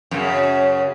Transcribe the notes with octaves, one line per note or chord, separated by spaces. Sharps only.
F#2 C#3